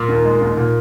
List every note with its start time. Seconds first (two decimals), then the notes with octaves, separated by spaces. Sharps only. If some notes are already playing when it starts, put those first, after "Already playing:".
Already playing: A#2
0.08 D#2
0.24 G#3
0.41 D#2
0.57 A#2